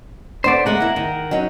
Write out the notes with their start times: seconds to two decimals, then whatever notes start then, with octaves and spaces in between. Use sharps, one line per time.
0.44 A3 B3 D4 C5 D5
0.66 C#3 G#3 A3 A#4 F#5
0.80 A#3 E4
0.96 D#3
1.31 F#3 C#4 D#4